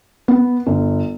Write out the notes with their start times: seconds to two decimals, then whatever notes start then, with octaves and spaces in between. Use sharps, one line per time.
0.28 B3
0.66 G1